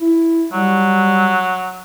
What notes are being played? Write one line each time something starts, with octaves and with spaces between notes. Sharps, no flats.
E4
F#3 G3